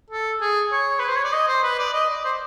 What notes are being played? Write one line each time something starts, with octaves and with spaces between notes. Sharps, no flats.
A4
G#4
C#5
B4
C5
C#5
D5
D#5
C5
B4
D5
D#5
D5
C5